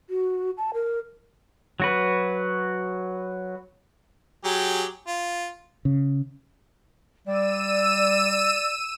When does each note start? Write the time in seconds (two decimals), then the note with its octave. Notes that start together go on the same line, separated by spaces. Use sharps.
0.10 F#4
0.58 A5
0.74 A#4
1.80 F#3 F#4 B4
4.45 F#3 G4 G#4
5.07 F4
5.85 C#3
7.27 G3 D5 E6 D#7 E7